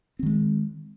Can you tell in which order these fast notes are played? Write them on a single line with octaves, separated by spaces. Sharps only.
C4 D#3 G#3